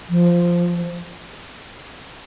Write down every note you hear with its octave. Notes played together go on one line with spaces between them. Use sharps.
F3